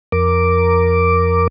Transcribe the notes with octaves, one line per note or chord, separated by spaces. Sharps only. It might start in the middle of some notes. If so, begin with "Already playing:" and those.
F2 A#4 D6